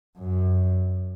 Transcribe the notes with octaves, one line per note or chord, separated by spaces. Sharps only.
F#2